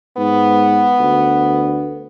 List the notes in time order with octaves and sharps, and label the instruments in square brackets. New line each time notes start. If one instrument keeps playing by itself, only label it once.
[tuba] G#2 [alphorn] B3
[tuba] D2